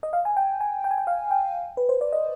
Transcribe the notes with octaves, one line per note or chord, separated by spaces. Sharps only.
D#5
F5
G#5
G5
G#5
G5
G#5
G5
F5
G5
B4
C5
D5
D#5